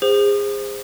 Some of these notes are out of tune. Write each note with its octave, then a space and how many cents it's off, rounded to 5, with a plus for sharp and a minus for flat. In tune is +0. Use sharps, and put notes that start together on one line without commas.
G#4 -30 C5 +0